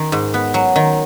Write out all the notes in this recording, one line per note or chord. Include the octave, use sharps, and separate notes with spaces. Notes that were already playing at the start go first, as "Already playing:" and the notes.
Already playing: D#3
G#2
B3
F#3
D#3